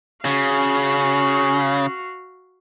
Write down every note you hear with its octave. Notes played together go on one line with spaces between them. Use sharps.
C#3 F#4 F5